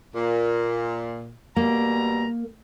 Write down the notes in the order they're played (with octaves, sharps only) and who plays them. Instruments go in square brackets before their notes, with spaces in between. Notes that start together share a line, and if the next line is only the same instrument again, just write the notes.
[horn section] A#2
[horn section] B2 G3 A#5 [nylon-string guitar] A#3